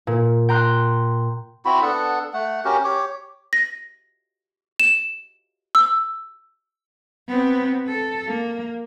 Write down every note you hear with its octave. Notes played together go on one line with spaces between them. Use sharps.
A#2
G5 A#5 C6 F#6
C4 E4 F#4 B5
B3 D4 A4 F#5
A3 F#5
C#4 F#4 G4 A#4
G4 C#5 D6
A#6
E7
E6
B3 C4
A4
A#3